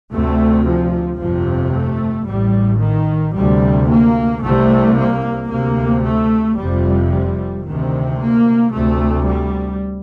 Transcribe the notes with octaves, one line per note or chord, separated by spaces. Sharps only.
D2 C3 A3
F3
G1 F2 C3 F3
A3
A1 A2 G3
D#3
D2 C3 G3
A#3
C2 C3 A3
A#3
D2 C3 A#3
A3
F1 F2 C3 G3
G3
D2 C3 D#3
A#3
D2 C3 A3
G3